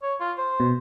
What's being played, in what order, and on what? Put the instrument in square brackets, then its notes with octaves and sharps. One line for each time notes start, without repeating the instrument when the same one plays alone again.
[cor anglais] C#5
F4
C5
[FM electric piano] B2